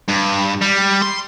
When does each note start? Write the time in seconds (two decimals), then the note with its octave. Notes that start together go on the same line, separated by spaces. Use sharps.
0.08 G2
0.62 G3
1.03 C6